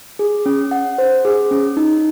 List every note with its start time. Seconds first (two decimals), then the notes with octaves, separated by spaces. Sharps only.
0.19 G#4
0.46 C#4
0.71 F#5
0.98 C5
1.25 G#4
1.51 C#4
1.77 D#4